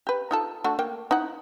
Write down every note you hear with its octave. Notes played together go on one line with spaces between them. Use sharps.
G4 B4
D#4 F4 A4
A3 D4 F#4
A#3 G5
D#4 E4 F#5